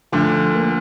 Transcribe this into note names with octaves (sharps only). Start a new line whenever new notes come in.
D2 D3 F3
A#3 F4